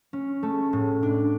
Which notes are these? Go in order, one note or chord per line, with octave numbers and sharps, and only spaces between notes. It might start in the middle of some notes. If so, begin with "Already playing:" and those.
C#4
A3
A2
D4